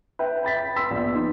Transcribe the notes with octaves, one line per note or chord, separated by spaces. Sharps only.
B4 E5 G5
G5 B5 A6 B6
C6 E6 B6
A#1 B3
D#4